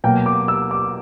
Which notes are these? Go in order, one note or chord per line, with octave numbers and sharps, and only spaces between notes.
B2 F#3 A#3 G5
D6
E6
D6